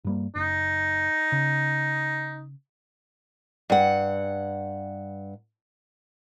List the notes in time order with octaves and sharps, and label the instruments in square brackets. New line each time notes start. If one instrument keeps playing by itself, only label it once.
[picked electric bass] G2 G3 A#3
[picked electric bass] F#1 [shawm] D#4
[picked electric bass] C#3
[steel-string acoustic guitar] G2 F#5